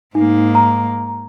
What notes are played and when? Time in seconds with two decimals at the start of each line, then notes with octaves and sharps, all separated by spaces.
0.15 G#2 A#3 D#4
0.55 A#5